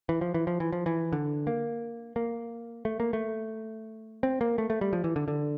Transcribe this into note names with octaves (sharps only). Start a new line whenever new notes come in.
E3
F3
E3
F3
E3
F3
E3
D3
A#3
A#3
A3
A#3
A3
C4
A#3
A3
A3
G3
F3
E3
D3
D3